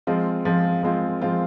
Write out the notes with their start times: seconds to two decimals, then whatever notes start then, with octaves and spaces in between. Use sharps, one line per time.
0.07 F3 G#3 C4 F4
0.45 F3 G#3 C4 F4
0.83 F3 G#3 C4 F4
1.21 F3 G#3 C4 F4